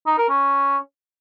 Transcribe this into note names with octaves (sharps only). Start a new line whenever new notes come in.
D#4
A#4
C#4